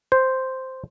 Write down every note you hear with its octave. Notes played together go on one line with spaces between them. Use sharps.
C5